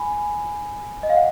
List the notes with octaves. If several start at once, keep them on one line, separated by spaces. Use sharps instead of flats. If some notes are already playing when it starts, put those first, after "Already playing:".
Already playing: G#5 B5
D#5
F5
F#5